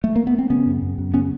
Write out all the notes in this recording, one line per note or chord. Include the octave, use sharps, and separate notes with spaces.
A3
A#3
B3
C4
C#3 B3 C#4
F#2
F#2
F#2
C#3 B3 C#4